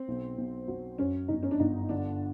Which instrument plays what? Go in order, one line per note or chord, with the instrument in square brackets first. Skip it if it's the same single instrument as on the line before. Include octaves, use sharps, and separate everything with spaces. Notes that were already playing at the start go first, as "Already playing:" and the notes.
Already playing: [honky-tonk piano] C4
[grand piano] B1
B1
F#3
[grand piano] F#2 [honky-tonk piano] C#4
[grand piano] G1 [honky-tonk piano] D#4
[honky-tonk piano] C#4
D4
[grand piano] G1 [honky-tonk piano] D#4
[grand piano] D3 [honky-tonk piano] D4